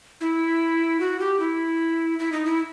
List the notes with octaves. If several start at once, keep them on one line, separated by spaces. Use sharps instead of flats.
E4
F#4
G4
E4
E4
D#4
E4